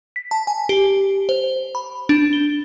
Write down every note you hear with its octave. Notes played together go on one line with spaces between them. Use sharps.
B6
A5
G#5
G4
C5
B5
D4
G7